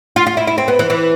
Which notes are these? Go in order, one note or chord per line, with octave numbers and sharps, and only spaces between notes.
F4
F4
E4
E4
C4
B3
E3
E3